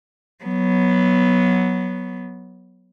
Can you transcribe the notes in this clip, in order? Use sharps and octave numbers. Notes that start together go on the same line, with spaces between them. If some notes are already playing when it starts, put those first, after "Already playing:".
F#3 B3